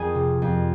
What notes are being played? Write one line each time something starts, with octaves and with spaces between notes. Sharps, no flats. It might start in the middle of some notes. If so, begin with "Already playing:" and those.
Already playing: F2 G#4 G#5
C3
F2